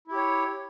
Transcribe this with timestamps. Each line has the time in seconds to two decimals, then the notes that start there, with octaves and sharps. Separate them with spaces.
0.08 E4
0.12 G4
0.16 C#5